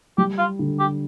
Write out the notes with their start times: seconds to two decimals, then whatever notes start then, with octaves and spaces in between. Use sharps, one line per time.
0.18 G3 G4
0.38 F4
0.59 D3
0.80 G4